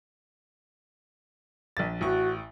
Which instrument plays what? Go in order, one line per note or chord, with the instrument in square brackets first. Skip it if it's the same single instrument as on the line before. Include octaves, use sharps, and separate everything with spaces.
[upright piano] A#1 A6
[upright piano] A1 C#6 [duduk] F#4